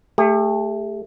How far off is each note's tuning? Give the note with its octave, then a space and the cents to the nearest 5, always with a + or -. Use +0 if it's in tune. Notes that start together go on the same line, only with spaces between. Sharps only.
A3 +0 G4 +40